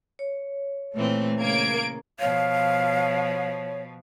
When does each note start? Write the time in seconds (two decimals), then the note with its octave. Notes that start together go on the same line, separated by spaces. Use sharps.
0.19 C#5
0.94 A#2 E3 A3 C4
1.39 C#3 A#3 G#6 D7
2.19 B2 F3 C#5 F5